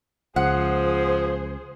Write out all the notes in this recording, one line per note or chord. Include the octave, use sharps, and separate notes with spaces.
C#2 F3 G#4 C5 F#5